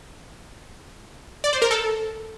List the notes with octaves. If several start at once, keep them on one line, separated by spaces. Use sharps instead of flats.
D5
C5
A#4
A4